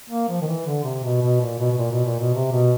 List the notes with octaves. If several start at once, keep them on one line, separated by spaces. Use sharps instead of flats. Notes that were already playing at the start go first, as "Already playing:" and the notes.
A#3
F3
D#3
E3
D3
C3
B2
B2
A#2
B2
B2
A#2
B2
A#2
B2
C3
B2